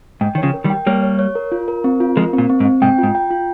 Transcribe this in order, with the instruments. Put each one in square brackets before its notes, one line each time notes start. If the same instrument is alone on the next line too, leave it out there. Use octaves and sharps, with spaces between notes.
[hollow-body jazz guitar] G#2 [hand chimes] G5
[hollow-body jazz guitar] D#3
[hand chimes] C#5
[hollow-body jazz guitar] C#3 F3
[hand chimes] A#4
[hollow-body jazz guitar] D#3 G3
[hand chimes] G5
[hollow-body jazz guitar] G3 A#3 [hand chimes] C#5
[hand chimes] C#5
C#5
A#4
F4
A#4
C4
F4
[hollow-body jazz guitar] F3 G#3 [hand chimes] A#4
[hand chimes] C4
[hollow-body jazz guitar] A#2
[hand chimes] C4
[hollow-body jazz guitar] G#2
[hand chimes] C4
[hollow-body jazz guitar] G#2 C3 [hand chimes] G5
[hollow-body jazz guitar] G#2 [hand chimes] F4
[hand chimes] G5
F4